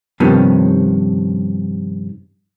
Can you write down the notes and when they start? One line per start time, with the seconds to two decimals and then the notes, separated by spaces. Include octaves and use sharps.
0.20 G2 C3 D#3 F3 B3 C#4